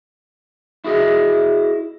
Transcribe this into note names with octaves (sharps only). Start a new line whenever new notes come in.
E4 F#4 G#4 D#5 E5